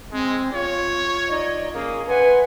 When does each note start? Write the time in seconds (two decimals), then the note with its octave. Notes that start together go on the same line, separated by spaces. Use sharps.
0.12 G#3 C4
0.53 F4 C#5
1.29 D#4 D5 D#5
1.74 A#3 C#4 G#4 A#4
2.07 B4 E5 F#5 G#5 C6